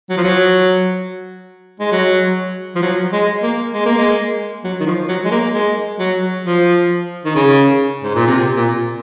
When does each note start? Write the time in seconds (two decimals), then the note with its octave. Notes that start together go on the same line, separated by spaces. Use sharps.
0.10 F#3
0.18 F3
0.24 F#3
1.80 G#3
1.92 F#3
2.76 F3
2.82 F#3
3.13 G#3
3.43 A#3
3.73 G#3
3.86 A#3
3.98 G#3
4.64 F#3
4.80 D#3
4.86 F3
5.09 F#3
5.25 G#3
5.31 A#3
5.54 G#3
5.99 F#3
6.46 F3
7.25 D#3
7.35 C#3
8.03 G#2
8.15 A#2
8.27 C3
8.56 A#2